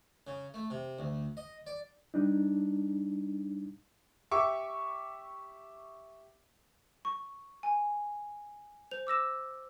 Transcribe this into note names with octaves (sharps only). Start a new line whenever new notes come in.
C#3
A3
C3
D2
D#5
D5
G3 D4 D#4
G4 E5 C#6 D6
C#6
G#5
C5 F7
D6 E6 A#6 E7